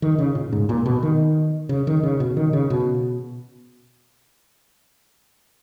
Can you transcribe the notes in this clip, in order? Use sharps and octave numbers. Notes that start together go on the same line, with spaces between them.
D#3
C#3
A#2
G#2
A#2
B2
D#3
C#3
D#3
C#3
B2
D#3
C#3
B2